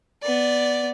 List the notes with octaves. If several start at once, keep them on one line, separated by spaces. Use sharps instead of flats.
B3 D5